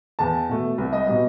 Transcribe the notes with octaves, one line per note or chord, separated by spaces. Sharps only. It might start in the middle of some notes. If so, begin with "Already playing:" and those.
E2 A5
B2 A3
C2
D#5
B2 G3 D#5